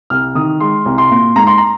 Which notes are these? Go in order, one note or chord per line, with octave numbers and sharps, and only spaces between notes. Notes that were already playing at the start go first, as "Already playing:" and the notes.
C2 F6
D#3 D#6
G#3 C6
C2
C6
A#2
G#2 A#5
C6
A#5